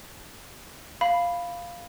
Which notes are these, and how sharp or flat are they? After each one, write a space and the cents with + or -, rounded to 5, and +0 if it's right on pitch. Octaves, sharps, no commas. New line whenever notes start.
F5 +0 B5 +0